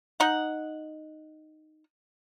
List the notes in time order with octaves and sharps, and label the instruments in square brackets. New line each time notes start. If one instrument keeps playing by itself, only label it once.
[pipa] D#4 F#5